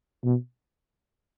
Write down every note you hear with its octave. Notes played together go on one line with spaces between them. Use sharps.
B2